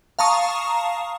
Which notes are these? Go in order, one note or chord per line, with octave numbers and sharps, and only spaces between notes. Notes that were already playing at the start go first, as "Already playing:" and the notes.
F5 A5 A#5 C#6 D#6